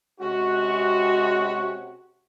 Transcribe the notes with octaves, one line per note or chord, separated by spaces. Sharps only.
C3 G#3 C#4 F#4